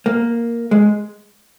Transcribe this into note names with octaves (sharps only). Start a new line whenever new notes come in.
A#3
G#3